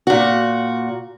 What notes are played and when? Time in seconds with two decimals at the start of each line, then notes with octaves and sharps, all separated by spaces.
0.07 A#2 F#4